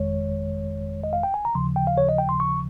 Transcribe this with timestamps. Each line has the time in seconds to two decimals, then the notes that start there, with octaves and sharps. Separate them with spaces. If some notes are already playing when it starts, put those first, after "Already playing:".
Already playing: G1 F2 D#3 G#3 C#5
1.04 D#5
1.13 F5
1.23 G5
1.34 G#5
1.45 A#5
1.55 D#2 C#3 F3 C6
1.76 G5
1.87 F5
1.98 C#5
2.09 D#5
2.18 G5
2.29 C6
2.40 C#6